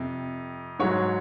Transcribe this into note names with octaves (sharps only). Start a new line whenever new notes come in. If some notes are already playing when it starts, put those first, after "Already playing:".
Already playing: F2 C3
G#2 F#3 C#5